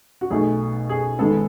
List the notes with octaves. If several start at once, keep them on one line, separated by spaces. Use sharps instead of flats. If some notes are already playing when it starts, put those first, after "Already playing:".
F#4
B1 B2 A3 G#4
G#4
G#1 G#2 G#3 B3 A4